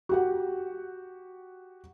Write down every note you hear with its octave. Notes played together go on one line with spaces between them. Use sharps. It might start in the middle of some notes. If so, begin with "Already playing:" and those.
F#4 G4 F#5